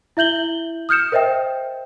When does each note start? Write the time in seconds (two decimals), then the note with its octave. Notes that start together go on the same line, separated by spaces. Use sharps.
0.17 E4 E5 G6 F#7 G7
0.89 D#6 F6 G6 C#7 E7
1.12 A#4 C5 D#5 E5 G5